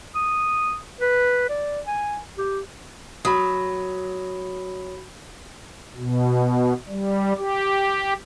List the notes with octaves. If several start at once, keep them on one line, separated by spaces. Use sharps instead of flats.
D#6
B4
D5
G#5
G4
F#3 B5 D#6
B2
G3
G4